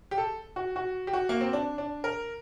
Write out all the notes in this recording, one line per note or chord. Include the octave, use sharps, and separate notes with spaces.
G4
A4
F#4
F#4
G4
F#4
A#3
C4
D4
D4
A#4